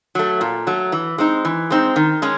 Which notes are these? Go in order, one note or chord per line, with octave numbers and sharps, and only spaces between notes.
F#3 A3
A#2
F#3 A3
E3
G#3 C4 D#4
E3
G#3 C4 D#4
D#3
G#3 C#4